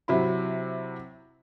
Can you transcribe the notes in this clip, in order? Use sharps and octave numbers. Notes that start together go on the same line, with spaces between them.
C3 F#3 E4 B5